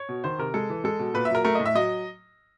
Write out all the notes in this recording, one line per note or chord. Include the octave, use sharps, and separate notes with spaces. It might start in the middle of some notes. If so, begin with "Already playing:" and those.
Already playing: C#5
B2
D#3 C5
C3 A#4
G#3 A4
E3
G#3 A4
B2
A#2 B4
E5
F#3 A#4
A3 A#4
A2 D#5
E5
F#3 D#5